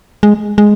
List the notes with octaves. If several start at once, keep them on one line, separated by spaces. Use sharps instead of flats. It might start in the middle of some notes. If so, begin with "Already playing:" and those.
G#3
G#3